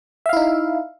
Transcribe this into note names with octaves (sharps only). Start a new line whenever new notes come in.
D#4 E4 E5 F5